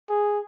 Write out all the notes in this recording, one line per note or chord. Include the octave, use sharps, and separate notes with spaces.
G#4